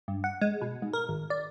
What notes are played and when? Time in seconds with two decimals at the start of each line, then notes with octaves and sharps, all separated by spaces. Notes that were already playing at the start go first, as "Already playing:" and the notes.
0.08 G2
0.24 F#5
0.41 G#3
0.62 B2
0.82 G#2
0.93 A#4
1.09 G#1
1.30 D5